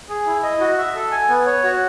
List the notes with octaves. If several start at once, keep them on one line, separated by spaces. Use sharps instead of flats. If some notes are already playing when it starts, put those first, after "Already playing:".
G#4
E4
D#5
F#4
E5
A4
G#5
B3
C#5
F#4